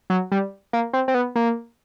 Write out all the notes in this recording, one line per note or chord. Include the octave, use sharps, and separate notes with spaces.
F#3
G3
A#3
C4
C4
B3
A#3